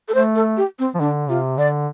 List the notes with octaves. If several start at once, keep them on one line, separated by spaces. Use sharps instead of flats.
A4
A3 C5
A4
G4
C4
F3
D3 D4
C3 F4
D3 D5